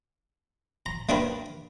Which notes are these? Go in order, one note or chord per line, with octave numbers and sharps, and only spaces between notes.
A#5
A3 A#3 D4 G4 A#4 B4